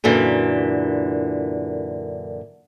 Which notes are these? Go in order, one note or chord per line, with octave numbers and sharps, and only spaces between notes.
F#2 A#2 D3 E3